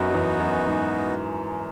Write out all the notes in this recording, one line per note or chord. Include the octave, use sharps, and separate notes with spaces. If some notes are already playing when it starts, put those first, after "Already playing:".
Already playing: F#2 B3 D#4 F#4
F#2
E2
F#2
G#2